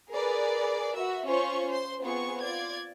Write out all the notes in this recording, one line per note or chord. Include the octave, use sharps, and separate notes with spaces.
G#4 A#4 B4 D5
F#4 E5
C#4 F4 C5 C#6
C5 C6
B3 C4 F4 G#4 C#6
F4 D5 G#6